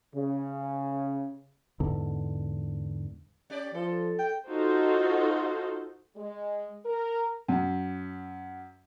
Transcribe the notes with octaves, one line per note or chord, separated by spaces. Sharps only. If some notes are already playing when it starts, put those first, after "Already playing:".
C#3
E2 G#2 D3
C#4 G4 D5
F3 A4
G5
D#4 F4 F#4 A4 C5
G#3
A#4
F#2